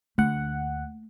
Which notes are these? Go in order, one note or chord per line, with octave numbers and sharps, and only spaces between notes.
D2 A3 A#3 F#5